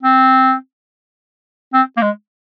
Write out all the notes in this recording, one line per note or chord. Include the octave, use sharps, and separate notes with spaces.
C4
C4
A#3
G#3